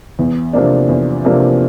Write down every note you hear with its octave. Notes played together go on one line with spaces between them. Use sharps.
E2
C3 F3 A#3 D4
E2
C3 F3 A#3 D4